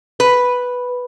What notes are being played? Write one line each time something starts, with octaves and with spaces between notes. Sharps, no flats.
B4